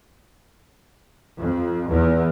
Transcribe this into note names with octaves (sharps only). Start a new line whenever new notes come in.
F2
E2